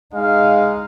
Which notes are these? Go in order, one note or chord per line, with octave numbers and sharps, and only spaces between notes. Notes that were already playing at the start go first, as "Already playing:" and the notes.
G#3 D#4 F5